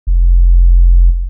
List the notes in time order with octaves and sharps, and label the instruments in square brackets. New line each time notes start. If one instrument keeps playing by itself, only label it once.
[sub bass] F1